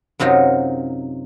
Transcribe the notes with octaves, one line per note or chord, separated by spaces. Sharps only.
F#2 C3 F#3 D#4 F4